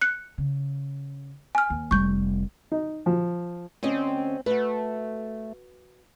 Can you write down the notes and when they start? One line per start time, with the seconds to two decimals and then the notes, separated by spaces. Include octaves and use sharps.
0.01 F#6 C#7
0.38 C#3
1.55 G#5 F6
1.70 D#2
1.91 F1 G3 C#6 G6
2.72 D#4
3.06 F3
3.83 D2 C4 C#4 D#5
4.46 A3 F#4 B4